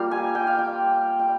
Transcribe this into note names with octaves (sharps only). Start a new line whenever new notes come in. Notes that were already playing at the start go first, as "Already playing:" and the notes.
Already playing: G3 A#3 F4 F5
G#5
G5
F5
G5
G5